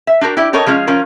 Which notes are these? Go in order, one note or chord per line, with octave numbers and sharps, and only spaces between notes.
E5
D4 F#4 G4 A#4
E4 G4 D5
G4 A4 A#4 C#5 D#5
F3 G#3 C#4 F4
F3 C#4 F4 A#4